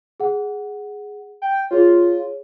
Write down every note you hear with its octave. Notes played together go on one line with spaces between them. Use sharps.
G#4 F#5
G5
F4 G#4 C#5